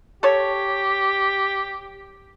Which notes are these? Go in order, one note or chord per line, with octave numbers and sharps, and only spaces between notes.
G4 A4 C#5